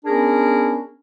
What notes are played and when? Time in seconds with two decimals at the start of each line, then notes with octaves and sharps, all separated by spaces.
0.05 B3 C#4 D4 G#4 A#4